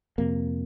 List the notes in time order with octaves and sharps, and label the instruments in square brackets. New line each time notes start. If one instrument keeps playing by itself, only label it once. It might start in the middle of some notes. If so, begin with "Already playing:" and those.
[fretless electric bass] F2 C3 A#3